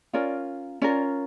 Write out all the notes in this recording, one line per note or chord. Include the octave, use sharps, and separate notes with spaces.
C#4 F4 A#4 D5
C#4 F4 A#4 D5